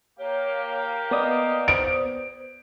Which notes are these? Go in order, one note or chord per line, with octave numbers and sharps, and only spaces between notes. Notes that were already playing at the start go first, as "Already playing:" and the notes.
A#3 G4 C#5
B3 D5 D#5 D#6
C5 D7